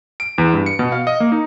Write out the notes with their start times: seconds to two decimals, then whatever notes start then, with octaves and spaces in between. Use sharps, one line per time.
0.20 D7
0.38 E2
0.53 G2
0.66 C#7
0.79 B2
0.92 F5
1.07 D#5
1.20 A#3
1.32 D#4